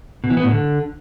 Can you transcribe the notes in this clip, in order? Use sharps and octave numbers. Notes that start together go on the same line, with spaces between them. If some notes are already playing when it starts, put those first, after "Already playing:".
B2
E3
B3
A2
D3